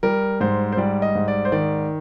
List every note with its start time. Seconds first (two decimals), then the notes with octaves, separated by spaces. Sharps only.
0.03 G3 A#4
0.41 G#2 C5
0.72 C5
0.77 G3 D5
1.02 D#5
1.15 G#2
1.28 D5
1.45 C5
1.52 D#3 D5